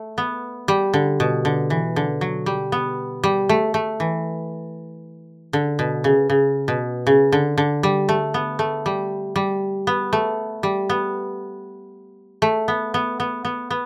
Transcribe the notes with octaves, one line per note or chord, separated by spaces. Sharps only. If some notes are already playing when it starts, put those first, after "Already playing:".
Already playing: A3
B3
G3
D3
B2
D3
E3
D3
F#3
G3
B3
G3
A3
A3
E3
D3
B2
C#3
C#3
B2
C#3
D3
D3
G3
A3
B3
A3
G3
G3
B3
A3
G3
B3
A3
B3
B3
B3
B3
B3